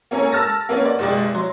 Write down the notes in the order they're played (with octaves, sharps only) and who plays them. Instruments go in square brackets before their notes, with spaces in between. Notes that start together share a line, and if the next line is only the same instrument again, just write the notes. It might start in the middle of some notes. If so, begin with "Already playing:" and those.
[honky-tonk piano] A#3 C#4 A4 A#4 G#5
A5 E6 F6 A6 A#6
A#3 B3 C#4
D5
F#1 B2 G#3 G4 D5
F#3 C6